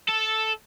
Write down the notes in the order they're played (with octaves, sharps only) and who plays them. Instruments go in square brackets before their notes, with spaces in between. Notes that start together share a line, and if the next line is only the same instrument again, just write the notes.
[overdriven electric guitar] A4